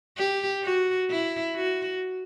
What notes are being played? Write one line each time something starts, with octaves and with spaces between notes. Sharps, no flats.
G4
F#4
E4
F#4